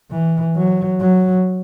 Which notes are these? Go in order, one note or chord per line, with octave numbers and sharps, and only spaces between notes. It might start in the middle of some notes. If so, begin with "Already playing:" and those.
E3
F#3
F#3